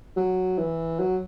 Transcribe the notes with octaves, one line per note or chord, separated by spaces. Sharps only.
F#3
E3
F#3